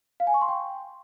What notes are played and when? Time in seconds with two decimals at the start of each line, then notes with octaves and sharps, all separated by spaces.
0.20 F5
0.27 G#5
0.34 C#6
0.41 C6
0.48 G5